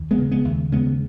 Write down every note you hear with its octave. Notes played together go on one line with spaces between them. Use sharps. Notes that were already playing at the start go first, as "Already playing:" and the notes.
Already playing: D#2
G#3 B3
C#3
G#3 B3
D#2
C#3 G#3 B3